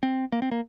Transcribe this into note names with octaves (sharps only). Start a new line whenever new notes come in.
C4
A#3
C4
A#3